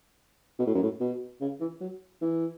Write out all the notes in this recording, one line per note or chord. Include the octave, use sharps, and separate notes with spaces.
B2
A2
F#2
A2
B2
C#3
E3
F#3
E3